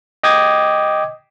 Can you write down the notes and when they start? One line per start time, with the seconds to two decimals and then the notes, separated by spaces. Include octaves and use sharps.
0.23 D#5 G5 D6 D#6 G#6